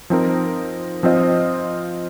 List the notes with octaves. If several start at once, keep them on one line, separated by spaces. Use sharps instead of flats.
F3 C4 D#4 A#4
F3 C4 F4 C5 D#5